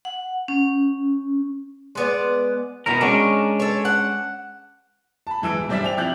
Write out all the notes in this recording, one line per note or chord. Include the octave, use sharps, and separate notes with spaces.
F#5
C#4
G#3 B3 D5
B2 D#3 E4 A#4
G#3 C#4 D4 A#4
A4 C#5
F#5
A5 B5
G#2 E3 E6 D7
D#1
G2 G3 C5 D5 E5 B6
G5 F7
C3 F3 E4 D5 G6 F#7